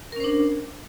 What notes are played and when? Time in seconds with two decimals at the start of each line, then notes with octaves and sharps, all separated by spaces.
0.12 A#4
0.16 C#4
0.20 C5
0.24 D4